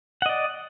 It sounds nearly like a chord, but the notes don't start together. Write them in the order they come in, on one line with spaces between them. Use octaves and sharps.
F#5 D#5 D5